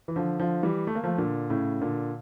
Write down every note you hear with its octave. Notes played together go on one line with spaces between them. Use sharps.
E3
D3 F3
D3 F3
E3 G3
A3
A#3
F3 A3
A#2 D3
A2 C#3
A#2 D3